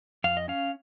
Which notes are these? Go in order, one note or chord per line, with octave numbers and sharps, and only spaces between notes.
F2 F5
D#5
C#4 F5